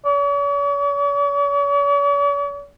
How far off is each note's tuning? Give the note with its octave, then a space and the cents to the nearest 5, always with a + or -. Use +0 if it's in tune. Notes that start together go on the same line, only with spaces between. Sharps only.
C#5 +45